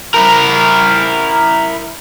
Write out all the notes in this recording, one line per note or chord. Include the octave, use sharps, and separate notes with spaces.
E4 A#4